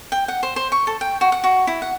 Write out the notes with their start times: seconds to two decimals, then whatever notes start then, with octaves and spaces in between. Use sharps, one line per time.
0.12 G5
0.28 F#5
0.43 C5
0.56 C5
0.72 C#6
0.87 A4
1.01 G5
1.21 F#4
1.32 F#5
1.44 F#4
1.67 E4
1.82 F#5